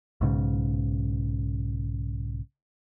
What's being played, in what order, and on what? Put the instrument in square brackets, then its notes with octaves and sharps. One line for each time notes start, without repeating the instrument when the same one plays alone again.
[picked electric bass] B1 G#2 C#3